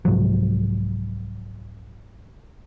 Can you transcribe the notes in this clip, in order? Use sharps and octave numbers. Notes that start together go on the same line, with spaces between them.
C2 G#2 F3 F#3